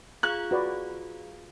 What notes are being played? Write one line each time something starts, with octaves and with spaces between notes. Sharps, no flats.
F4 G#4 F5 F#6
F#4 B4 D5